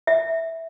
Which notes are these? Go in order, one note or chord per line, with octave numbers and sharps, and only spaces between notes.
E5